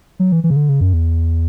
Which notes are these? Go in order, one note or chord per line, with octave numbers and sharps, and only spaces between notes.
F#3
E3
E3
C#3
D3
C#3
F#2
E2